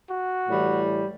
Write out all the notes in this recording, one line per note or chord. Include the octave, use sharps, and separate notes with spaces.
F#4
A2 E3 G3